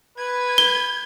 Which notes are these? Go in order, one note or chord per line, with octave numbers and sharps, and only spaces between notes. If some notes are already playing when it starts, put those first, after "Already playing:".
B4 G#6
G7